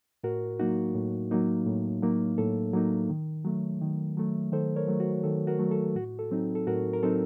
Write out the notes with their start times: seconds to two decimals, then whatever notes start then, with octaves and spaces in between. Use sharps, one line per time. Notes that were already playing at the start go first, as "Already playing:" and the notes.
0.24 A2 F#4 A#4
0.59 F#3 A#3 D#4 F#4
0.95 A2
1.31 F#3 A#3 D#4
1.66 A2
2.02 F#3 A#3 D#4
2.38 A2 A4
2.73 F#3 A#3 D#4
3.10 D#3
3.45 F#3 A3
3.82 D#3
4.17 F#3 A3
4.52 D#3 A4 C5
4.76 A#4 C#5
4.88 F#3 A3
5.00 F#4
5.24 D#3 A4
5.47 F#4 A#4
5.59 F#3 A3
5.71 A4
5.95 A2 F#4
6.19 A4
6.31 F#3 C4 D#4
6.55 A4
6.67 A2 F#4 A#4
6.93 A#4
7.03 F#3 C4 D#4 A4